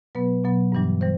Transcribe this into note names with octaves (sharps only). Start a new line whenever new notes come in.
B2 F#3 B3 B4
B2 F#3 B3
G2 E3 G3 D4
E3 G3 C5